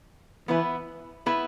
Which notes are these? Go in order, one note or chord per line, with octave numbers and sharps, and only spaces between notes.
E3 B3 E4 B4
B3 E4 B4